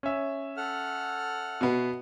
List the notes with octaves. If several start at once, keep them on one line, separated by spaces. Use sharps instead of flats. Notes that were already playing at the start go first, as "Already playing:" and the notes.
C#4 E5
A4 F#5 F6
B2 B3